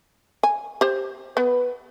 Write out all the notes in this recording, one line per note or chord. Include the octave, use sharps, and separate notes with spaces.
G#5
G4 C5
B3 B4